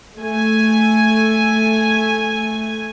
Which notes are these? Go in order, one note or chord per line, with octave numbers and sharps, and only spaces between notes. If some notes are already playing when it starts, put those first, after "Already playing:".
A3 G#5